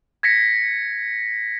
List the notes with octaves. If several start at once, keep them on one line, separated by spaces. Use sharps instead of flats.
G#6 A#6 B6 C#7